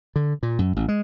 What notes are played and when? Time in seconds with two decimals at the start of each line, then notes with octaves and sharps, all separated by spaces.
0.16 D3
0.43 A#2
0.59 F#2
0.76 A1
0.88 G#3